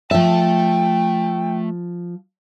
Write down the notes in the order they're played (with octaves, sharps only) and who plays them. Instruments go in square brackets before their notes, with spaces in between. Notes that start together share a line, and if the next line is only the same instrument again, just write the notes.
[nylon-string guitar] F3 E5 [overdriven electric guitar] A3 A5 [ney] G5